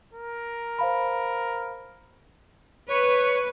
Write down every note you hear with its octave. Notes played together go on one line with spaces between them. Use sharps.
A#4
C5 F5 B5
B4 C#5